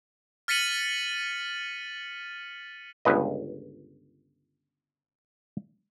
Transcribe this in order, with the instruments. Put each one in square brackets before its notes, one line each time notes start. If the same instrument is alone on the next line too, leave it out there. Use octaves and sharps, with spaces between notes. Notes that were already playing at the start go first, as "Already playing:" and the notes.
[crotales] F6 A6 B6 C#7 D#7 F#7
[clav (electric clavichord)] G1 C#2 B4 D#5